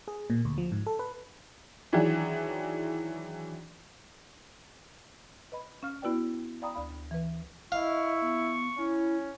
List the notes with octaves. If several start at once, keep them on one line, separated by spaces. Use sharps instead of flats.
G#4
A#2
D2
F3
G#2
A4
B4
D#3 E3 F#3 D4 G#4
B4 D#5 B5
C#4 F5 F6
B3 E4 F#4 B4 D5 G5
D5 F5 G5 A#5 B5 D#6
D2 D5 F5 B5
E3 B4
E4 D#5 F5 C#6
B3
C#4 E4